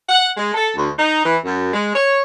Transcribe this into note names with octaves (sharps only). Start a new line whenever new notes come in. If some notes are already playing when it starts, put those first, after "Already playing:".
F#5
G#3
A4
D2
D#4
E3
F#2
G#3
C#5